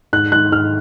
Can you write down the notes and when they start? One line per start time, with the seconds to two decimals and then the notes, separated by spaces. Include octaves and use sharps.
0.13 G#2 F#6
0.32 G#2 F#6
0.52 G#2 F6